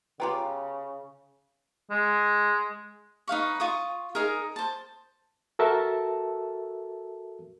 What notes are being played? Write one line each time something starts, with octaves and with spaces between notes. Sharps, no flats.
C#3 B3 F4 G4 G5 A#5 B5
G#3
D#4 B4 F5 C#6
F4 C#6 D#6
D#4 G#4 A#4
C5 A5
F#4 A4 A#4 E5 A5